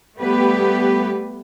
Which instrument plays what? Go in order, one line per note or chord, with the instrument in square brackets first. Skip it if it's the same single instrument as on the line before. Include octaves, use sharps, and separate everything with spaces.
[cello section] G3 A3 B3 G4 B4